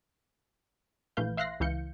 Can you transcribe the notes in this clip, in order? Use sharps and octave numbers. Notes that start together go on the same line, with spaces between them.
A#1 E3 A3 B4 F5 G6
E5 F5 C6 F#6 A#6 C7
C#2 E3 F5 G6 C#7